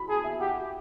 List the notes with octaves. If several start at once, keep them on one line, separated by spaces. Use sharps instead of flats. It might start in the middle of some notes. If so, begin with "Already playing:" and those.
Already playing: B5
G#4 A5
E5
G4 F#5